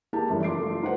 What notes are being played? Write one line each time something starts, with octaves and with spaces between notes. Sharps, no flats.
A#3 E4 G4 G#4 A5
F#2 C#3 E3 F3 G3 A3
C6 D6 C7 D7
A3 F4
D#4 F4 B4 C5 F#5